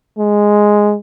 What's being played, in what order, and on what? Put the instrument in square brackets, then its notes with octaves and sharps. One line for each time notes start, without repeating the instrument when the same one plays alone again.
[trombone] G#3